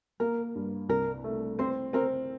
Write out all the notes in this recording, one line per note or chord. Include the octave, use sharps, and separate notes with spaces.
A#3 A#4
G2
C2 A#4
A3
C4 C5
C4 A#4